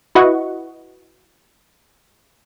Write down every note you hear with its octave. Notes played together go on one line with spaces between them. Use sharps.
E4 F#4 B4 D#5 F#5 C#6